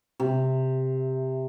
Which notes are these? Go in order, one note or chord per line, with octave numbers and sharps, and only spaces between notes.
C3